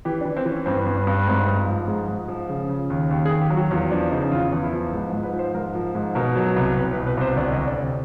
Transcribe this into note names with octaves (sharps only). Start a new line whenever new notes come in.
E3 G4
D4
E3
C4
E3
C#4
G2 C4
G2
B3
G2
G#2 C4
G#2
F4
F3
G#2 G#4
G#2
F3
C#3
C#3
D#2
D#2 G4
G#4
D#2
G4
F#3
F#4
E2 F4
F3 D4
C#3 D#4
E2 F4
E2
E4
F3
G#2
G#2
B4
F3
C5
G#2 A#4
F3
G#2
B2 A#4
F#3
C2
C2 B4
B4
B2
B4
C2 C5
D2 D5
D#5
D2
D5
C3
D5